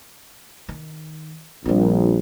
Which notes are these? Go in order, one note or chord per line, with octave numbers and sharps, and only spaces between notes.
D#3
A#1 G3 C4